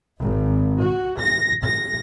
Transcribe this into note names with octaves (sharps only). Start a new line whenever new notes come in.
G#1
F#4
A#6
A#6